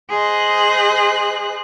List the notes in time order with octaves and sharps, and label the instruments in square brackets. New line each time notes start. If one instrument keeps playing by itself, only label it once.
[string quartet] G#4 C5 D#5 F#6